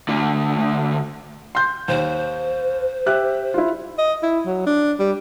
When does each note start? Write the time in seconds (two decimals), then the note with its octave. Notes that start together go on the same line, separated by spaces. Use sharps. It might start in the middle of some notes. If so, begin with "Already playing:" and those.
0.08 D2 D3
1.55 C6 G6
1.88 D#2 C5
3.06 G4 E5 F#6
3.54 E4 F4
3.98 D#5
4.23 E4
4.46 F#3
4.66 D4
4.99 G3